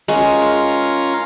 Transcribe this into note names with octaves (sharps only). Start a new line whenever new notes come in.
G#3 C#4 F4 A#4